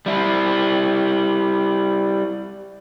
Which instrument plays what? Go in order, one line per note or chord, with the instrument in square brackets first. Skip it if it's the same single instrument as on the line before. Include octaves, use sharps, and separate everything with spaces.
[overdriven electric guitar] G3 E4